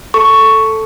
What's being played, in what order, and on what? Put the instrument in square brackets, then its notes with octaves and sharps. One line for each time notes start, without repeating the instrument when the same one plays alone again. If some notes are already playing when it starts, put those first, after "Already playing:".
[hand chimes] A4 C#6